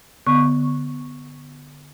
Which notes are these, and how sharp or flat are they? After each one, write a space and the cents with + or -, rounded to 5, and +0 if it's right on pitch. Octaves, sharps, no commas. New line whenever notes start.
D3 +0 B3 +0 C#6 -5